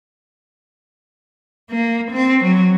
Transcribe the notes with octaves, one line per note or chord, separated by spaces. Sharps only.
A#3
C4
F#3